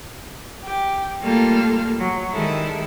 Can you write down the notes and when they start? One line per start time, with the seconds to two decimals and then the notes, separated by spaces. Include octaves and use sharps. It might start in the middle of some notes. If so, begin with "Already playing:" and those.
0.62 G4
1.22 G3 A3 A#3 F4 A4 F6
1.99 F#3
2.33 D#3 G3 G#3 E4 A4